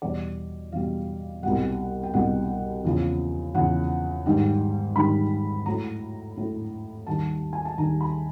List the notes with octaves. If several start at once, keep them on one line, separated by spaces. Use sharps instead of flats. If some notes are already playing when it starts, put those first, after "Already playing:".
E2 B2 G3 D5
E2 B2 G3 F5
C2 B2 G3 F#5
G5
C2 B2 G3 F#5
E2 C#3 F3
E2 C#3 F3 F#5
G#2 D#3 G3
G#2 D#3 G3 B5
A2 F#3 A#5
A2 F#3
D#2 D#3 G3 A5
G#5
A5
D#2 D#3 G3 A#5
B5